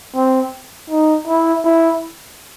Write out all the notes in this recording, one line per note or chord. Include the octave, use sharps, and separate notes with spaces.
C4
D#4
E4
E4